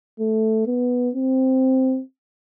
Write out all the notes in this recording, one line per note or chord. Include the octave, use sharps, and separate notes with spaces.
A3
B3
C4